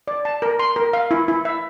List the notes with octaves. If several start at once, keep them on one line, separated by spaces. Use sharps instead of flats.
D5
A5
A#4
C6
A#4
F5
E4
E4
E5